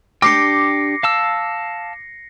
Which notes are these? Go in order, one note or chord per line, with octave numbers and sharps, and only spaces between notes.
D4 G4 G5 D6 A#6 C7 C#7
F5 A5 E6